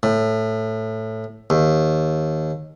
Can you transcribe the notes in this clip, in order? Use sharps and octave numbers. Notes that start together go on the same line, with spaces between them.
A2
D#2